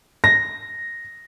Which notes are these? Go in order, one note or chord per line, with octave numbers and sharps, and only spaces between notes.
A#6